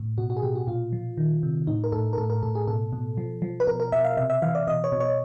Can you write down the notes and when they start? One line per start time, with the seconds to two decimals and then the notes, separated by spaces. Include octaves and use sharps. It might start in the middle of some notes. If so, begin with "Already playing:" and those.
Already playing: A2
0.18 B2 F#4
0.30 F#4
0.37 G#4
0.42 B2 G4
0.55 F#4
0.67 A#2 F4
0.92 F3
1.18 D#3
1.43 C3
1.67 A2 D#4
1.84 A#4
1.92 A2 A4
2.13 A#4
2.17 A2 A4
2.30 A#4
2.43 A2 A4
2.55 G#4
2.68 B2 A4
2.93 B2
3.17 F3
3.42 F3
3.60 B4
3.67 B2 A#4
3.80 A#4
3.92 B2 E5
4.05 F5
4.17 C3 E5
4.30 E5
4.42 E3 F5
4.55 D5
4.67 B2 D#5
4.84 C#5
4.92 B2
5.00 C#5